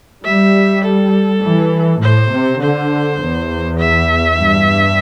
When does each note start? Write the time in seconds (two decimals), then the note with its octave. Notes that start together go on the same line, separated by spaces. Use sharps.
0.24 G3 E5
0.83 A4
1.43 E3
2.02 A2 C5
2.32 C3
2.62 D3 C5
3.21 E2
3.79 E5
4.38 G2